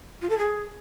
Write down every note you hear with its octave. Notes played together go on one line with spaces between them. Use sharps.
F4
A4
G#4